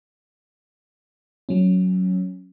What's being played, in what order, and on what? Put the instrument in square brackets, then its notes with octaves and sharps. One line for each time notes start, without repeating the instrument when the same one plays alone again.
[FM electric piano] F#3 C#4